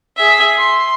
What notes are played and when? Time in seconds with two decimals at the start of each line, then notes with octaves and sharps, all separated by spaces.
0.16 G#4 E5
0.57 C6